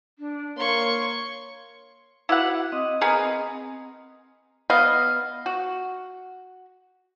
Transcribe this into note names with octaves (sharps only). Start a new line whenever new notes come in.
D4
A#3 C#5 C6 C#6
E4 F#4 B4 F5 F#5 D6
C4 D#5 D#6
B3 G#4 A#4
B3 D#5 F5
F#4